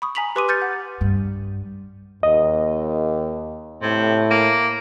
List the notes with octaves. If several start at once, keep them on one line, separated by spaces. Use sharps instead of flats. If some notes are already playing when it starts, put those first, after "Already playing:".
B5 C#6 D#6
G#5 A#5 B6 F7 F#7
G4 B4 C6 D6 D#6 D#7
F6 G6 A6 C#7
F#5
G2
D#2 D#5
A2 C3
A#3